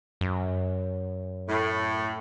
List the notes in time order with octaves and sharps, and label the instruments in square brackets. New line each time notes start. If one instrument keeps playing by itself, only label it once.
[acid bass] F#2
[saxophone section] A2